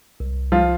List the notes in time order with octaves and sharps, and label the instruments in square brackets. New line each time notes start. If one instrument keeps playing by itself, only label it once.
[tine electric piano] C2
[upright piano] F3 F4